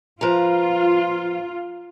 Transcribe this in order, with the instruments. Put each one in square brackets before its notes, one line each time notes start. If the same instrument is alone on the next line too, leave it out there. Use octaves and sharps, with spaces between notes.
[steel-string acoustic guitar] F3 B4 A#5 [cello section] F4